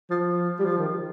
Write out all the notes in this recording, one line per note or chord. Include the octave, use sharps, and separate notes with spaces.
F3
G3
F3
D#3